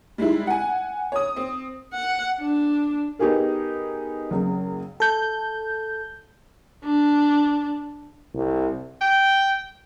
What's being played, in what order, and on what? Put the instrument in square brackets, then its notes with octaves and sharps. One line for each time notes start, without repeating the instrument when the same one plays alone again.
[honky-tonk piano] G3 G#3 D#4 E4
F#5 G#5
C#5 D#6
C4
[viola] F#5
D4
[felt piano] B3 D#4 G4 G#4 A#4
F#1 C#3
[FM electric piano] A4 G6
[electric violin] D4
[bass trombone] C2
[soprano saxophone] G5